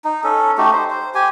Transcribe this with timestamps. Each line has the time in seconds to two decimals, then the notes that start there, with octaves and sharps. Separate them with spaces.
0.05 D#4
0.24 C#4 A4
0.58 A3 D#4 F#4 G4
0.73 C5
0.90 C5
1.15 G4 G#5